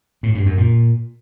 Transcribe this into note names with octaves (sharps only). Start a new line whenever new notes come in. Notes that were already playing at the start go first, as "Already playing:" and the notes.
A2
G2
F#2
A#2